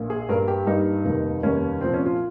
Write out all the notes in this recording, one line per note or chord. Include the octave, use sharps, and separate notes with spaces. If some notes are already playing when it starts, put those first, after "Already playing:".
Already playing: A#1 A#2
G#4
G2 G3 A#3 A#4
G4
G2 G3 A#3 D#4
F1 D#2 D#3 G3
F1 D#2 D#3 G3 C#4
C2 A#2 F3 C4
C#4
F4